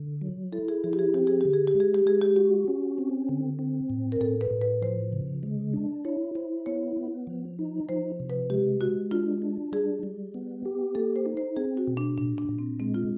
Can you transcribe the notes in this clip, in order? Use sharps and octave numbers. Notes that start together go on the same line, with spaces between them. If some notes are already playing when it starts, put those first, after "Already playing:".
Already playing: D3
F#3
E4 A4
G#4
F3 G#4
G4
G#4
C4 G4
G#4
D3 G4
G#4
G4
G#3
G#4
G4
G#3 G#4
G4
F#4 G4
C#4
C4
D3
C4
A2
A#4
A2 A4
B4
A2
B4
F3 C5
C#3
G#3
D4
E4 C#5
E4 C5
B3 C#5
B3
F3
D#4
F3 C5
C3
B4
G#3 G4
G#3 F#4
D4 F4
D4
G3 G#4
G3
B3
G4
A#3 A4
C5
D#4
C5
C4 G#4
F#4
B2
D4
A#2 D4
D4
A#2
C4
G#3 C4
F4